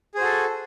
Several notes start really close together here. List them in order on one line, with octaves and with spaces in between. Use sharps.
G#4 C5 F#4 A4